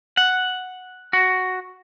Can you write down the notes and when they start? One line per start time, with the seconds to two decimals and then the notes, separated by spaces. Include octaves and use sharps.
0.17 F#5
1.13 F#4